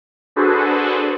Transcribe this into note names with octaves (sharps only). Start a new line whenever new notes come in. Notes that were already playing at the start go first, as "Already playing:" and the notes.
D4 F#4 G#4 A4 B4 C5